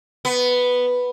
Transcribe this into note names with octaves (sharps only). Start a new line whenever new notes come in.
B3